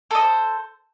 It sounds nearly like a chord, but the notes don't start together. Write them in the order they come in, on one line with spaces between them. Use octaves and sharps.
A4 D#5 C5